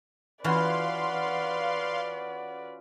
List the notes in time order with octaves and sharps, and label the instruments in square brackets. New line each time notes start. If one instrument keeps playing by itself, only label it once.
[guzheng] E3 [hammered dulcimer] C#4 F4 F#4 [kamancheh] B4 D5 [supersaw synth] F5 C6